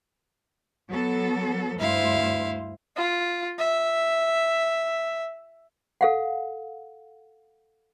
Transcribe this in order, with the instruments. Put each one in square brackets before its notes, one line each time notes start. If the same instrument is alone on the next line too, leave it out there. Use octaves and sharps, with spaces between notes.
[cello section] F#3 B3 A4
[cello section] D2 G2 C5 [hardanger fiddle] E4 F5
[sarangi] F4
E5
[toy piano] A4 F5 F#5